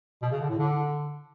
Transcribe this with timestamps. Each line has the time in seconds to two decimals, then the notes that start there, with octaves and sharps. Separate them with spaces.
0.22 B2
0.31 C#3
0.40 D3
0.49 A2
0.58 D3